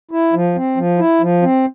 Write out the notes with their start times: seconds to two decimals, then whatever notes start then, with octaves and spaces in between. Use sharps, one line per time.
0.11 E4
0.33 F3
0.56 C4
0.77 F3
0.99 E4
1.21 F3
1.42 C4